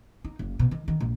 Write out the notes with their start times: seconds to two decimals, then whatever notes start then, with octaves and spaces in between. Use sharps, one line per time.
0.24 D#4
0.39 F#1
0.59 B2
0.71 D#3
0.88 D#3
1.00 A#1